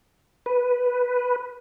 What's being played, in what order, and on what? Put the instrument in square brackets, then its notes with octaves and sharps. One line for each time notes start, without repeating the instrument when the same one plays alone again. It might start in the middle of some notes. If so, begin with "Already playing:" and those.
[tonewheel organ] B4